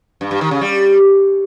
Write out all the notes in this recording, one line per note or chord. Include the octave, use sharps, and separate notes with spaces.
G2
G2
D#3
C#3
G3